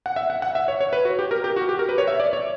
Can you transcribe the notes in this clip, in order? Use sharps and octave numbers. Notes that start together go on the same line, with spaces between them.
F#5
E5
F#5
F#5
E5
C#5
C#5
B4
F#4
G4
A#4
G4
F#4
G4
A#4
B4
C#5
E5
D5
C#5